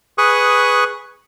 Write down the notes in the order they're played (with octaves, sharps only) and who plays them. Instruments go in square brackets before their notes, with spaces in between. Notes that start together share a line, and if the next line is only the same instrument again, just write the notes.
[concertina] G#4 B4 C#6 D#6 F#6